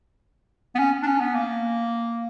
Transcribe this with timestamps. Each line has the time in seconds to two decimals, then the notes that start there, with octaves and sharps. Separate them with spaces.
0.75 B3
0.79 C#4
1.02 D4
1.07 C#4
1.20 B3
1.35 A#3